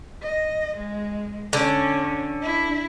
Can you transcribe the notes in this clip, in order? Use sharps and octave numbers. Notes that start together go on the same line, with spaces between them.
D#5
G#3
D3 C#4
E4